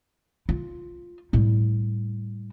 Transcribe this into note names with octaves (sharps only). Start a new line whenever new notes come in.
F4
A2 G3